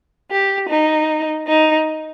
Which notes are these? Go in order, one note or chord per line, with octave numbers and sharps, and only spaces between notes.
G4
D#4
D#4